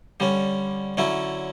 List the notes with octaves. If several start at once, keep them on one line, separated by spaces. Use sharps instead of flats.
D3 G3 C#4
D3 F#3 C#4 E4